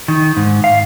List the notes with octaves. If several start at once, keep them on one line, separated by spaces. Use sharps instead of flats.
D#3
G#2
F5